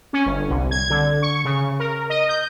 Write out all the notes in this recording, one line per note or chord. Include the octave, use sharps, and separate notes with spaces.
C#4
G1
C2
G#6
D3
C#6
C#3
A#4
D#5
G6